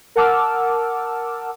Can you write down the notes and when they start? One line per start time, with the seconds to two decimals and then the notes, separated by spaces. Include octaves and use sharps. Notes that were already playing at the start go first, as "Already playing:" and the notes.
0.16 A#4 F#5 A5 D6 E6 F6